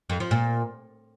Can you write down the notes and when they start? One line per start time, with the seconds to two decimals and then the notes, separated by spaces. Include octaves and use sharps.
0.10 F2
0.20 F3
0.31 A#2